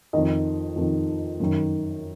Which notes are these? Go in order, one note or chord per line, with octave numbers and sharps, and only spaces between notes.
F2 D#3 D#5
F2 D#3
F#2 D#3